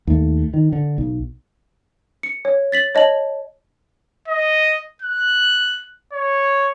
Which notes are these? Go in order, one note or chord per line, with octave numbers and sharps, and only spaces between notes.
D#2 A3
D#3
D3
B1
C#7
C#5
A6 B6 F#7
C#5 D#5 A5 F#7
D#5
F#6
C#5